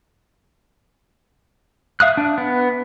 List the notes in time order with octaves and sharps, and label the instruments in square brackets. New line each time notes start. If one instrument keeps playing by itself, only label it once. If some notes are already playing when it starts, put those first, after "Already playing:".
[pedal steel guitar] E5 F5 D#6 F#6
D4
B3